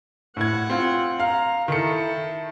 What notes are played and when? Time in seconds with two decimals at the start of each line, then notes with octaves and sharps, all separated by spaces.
0.37 A2 F#5 G#6
0.69 C4 F4
1.20 F5 A#5
1.68 D#3 E4 A4 C#7